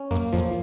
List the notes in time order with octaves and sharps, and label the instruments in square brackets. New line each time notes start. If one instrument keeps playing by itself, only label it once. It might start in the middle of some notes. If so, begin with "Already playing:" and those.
Already playing: [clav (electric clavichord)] C#4
[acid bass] F#2 [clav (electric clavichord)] A#3
[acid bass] F2 [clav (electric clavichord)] F3